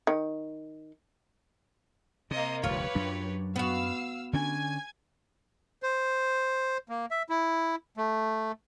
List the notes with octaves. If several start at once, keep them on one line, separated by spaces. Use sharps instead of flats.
D#3
C3 A#3 D#5
F1 D2 G2 F4 G4 B4 C#5
F#2 F#3 D4
B3 F#4 F5 E6
D3 C#4 D4 G#5 G#6
C5
A#3
E5
E4
A3